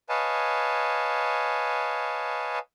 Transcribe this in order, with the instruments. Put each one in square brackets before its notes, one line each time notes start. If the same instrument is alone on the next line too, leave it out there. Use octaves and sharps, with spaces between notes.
[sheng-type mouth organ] B4 C#5 D#5 F5 G#5 A5